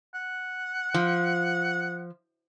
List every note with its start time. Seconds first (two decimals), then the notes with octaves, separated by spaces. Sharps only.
0.15 F#5
0.94 F3